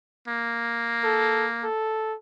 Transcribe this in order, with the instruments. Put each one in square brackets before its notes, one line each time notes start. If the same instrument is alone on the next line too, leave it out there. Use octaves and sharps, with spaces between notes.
[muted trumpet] A#3
[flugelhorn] A4
A4